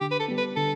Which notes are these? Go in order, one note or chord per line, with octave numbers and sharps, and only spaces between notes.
D3 G4
B4
A4
G3 B3
B4
D3 A4